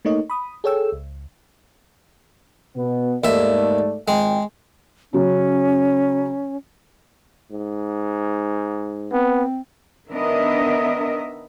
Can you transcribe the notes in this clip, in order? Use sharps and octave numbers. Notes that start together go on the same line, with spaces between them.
A3 A#3 D#4 C#5 D#5
B5 D#6
G#4 A4 C#5 G5 E6
C#2
B2 B3
D#2 G#2 A3 D5 E5
G#1 F2 G#3 G5
C#3 F#3 C#4
G#2
B3 C4
D#3 B3 D4 A#4 D#5 E5